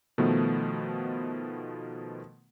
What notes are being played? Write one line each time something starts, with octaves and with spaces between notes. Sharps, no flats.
B2 D#3 F3 A3 B3